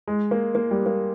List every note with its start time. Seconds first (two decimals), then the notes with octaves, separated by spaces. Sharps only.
0.08 G#3
0.31 A#3
0.55 A#3
0.71 G3
0.86 A#3